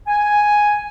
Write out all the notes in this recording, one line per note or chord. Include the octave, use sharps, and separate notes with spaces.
G#5